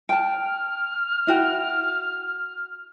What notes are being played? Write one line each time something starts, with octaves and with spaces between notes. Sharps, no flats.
G5 A5 F6
E4 F#4 G5